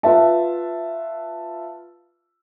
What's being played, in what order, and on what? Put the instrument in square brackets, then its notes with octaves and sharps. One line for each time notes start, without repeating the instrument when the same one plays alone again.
[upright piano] F4 B4 E5 A5